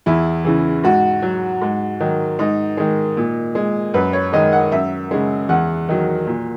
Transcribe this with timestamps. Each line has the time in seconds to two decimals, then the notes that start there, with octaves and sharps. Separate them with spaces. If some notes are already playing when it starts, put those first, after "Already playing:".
0.06 E2 E4
0.45 C#3 E3
0.84 G#2 F#4
1.22 F#3
1.62 G#2
2.00 D#3 F#3
2.39 G#2 D#4
2.77 D#3 G#3
3.17 A#2
3.55 G#3
3.94 F#2 B4
4.13 C#5
4.33 D#3 G#3 D#5
4.53 F#5
4.72 F#2 E5
5.11 C#3 G#3
5.49 E2 F#5
5.89 D#3 F#3
6.27 A#2